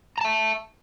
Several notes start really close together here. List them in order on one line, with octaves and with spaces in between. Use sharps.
A#5 A5 E5